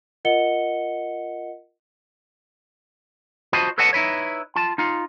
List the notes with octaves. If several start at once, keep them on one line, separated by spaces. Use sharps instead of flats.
F4 A#4 D#5 F#5 C#7 G7
F4 F#4 C5 D#5 A5 B5
A4 B4 C#5 D#5 F#5 A5
D#4 E4 B4 C#5
F4 A5
D#4 F4